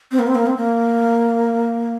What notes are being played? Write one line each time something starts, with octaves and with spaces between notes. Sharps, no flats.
C4
A#3
C4
A#3
C4
A#3